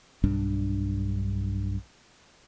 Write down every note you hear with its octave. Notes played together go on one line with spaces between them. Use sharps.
B1 G2 D4